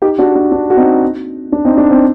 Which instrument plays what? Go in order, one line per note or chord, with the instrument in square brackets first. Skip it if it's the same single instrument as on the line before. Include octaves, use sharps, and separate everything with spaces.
[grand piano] D#4 G4
D4 F#4
D4
D4
F#4
C4 D#4
D4
C4 D#4
D4
C4